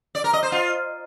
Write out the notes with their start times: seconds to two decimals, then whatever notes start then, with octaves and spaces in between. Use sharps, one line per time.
0.15 D5
0.24 A#4
0.33 D#5
0.43 C5
0.52 F4